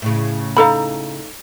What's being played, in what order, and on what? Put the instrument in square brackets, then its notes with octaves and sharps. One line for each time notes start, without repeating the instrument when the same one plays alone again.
[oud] A2 C#3
[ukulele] D#4 A4 A#5 [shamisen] F5 B5